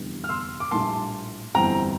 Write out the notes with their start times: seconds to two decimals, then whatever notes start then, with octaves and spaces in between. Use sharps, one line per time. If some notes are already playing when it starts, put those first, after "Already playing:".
Already playing: F1 E2 D3 G3
0.24 F6
0.29 C6 E6
0.60 D6
0.71 A#1 A2 G3 A#3 A5 C6
1.55 G1 F2 E3 G3 C4 G5 A#5